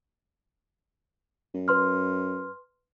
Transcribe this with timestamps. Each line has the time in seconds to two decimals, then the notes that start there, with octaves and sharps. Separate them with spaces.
1.54 F#2
1.68 B4 C6 F6